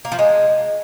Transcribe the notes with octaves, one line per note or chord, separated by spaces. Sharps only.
A#3
F3
G#3